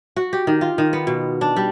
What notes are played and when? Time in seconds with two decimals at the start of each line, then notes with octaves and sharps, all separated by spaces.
0.16 F#4
0.33 G4
0.47 D#3
0.61 F4
0.78 D#3
0.93 B3
1.07 B2
1.41 D4
1.56 G3